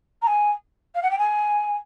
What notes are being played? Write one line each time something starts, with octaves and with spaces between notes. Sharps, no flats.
A#5
G#5
F5
F#5
G5
G#5